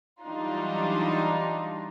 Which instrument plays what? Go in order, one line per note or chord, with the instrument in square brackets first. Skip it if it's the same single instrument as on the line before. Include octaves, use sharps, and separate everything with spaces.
[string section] E3 F#3 G3 D4 D#4 F4